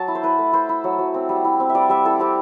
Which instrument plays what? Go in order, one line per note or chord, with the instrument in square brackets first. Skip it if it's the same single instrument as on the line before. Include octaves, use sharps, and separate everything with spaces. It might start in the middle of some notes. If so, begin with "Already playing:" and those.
Already playing: [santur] F#3 A5
E4
C5
E4 B4
A3
E4 C5
E4
F#3
F#3
C4
G3
E4
C4
E5
G3 D5
G3 E5
E4 A4
C4 G4